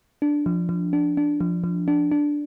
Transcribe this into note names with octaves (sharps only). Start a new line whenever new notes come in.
D4
F3
F3
D4
D4
F3
F3
D4
D4